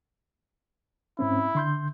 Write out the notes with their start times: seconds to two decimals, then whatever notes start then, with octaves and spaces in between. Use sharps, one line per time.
1.19 G#2 C4 C#4 E4
1.55 D3 C6 G6